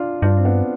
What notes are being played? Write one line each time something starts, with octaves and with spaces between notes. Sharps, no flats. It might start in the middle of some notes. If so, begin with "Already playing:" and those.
Already playing: D4 F4
G2 D4 F4
C4
B3 D4